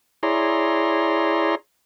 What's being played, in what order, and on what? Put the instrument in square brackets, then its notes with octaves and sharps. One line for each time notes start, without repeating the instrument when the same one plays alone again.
[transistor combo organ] E4 G#4 C#5 D5 A#5 C6